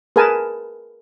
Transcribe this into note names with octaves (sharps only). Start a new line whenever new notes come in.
G#4 A#4 B4 G#5 A5